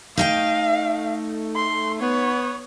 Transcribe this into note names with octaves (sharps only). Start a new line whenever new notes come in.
A3 D#4 D#5 F5 G5
C6
B3 C#5